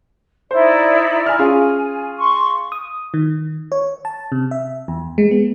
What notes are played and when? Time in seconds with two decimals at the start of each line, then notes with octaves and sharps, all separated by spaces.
0.51 D#4 E4 C5 D5
1.26 G#5 F6
1.39 C#4 F4 G#4 G#5
2.18 C6 C#6
2.72 D#6
3.14 D#3
3.72 C#5
4.05 A5
4.32 C3
4.51 E5
4.88 E2
5.18 G#3
5.31 B3